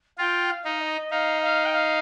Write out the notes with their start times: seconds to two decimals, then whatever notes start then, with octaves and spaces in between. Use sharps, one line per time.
0.18 F4 G5
0.50 F5
0.65 D#4
0.80 D#5
1.11 D#4 F5
1.42 F5
1.65 G5
1.72 F5